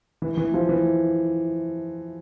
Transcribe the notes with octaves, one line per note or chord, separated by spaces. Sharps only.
E3
E3
F3
E3